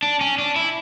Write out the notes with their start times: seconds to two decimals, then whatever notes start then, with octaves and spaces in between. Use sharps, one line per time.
0.03 D4
0.21 C#4
0.38 D4
0.56 E4